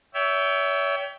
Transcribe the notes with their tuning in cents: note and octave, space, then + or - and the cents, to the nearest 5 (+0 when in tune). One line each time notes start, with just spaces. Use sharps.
C#5 +35 E5 +0 G5 +0